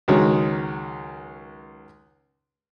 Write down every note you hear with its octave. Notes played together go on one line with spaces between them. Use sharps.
C#2 D#3 F#3 G#3